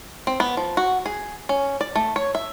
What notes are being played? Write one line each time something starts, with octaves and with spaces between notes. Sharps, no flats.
C4
B3
F3
F#4
G#4
C#4
D5
A3
C#5
E5